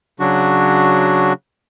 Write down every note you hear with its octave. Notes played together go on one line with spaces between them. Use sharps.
C#3 F#3 D4 F#4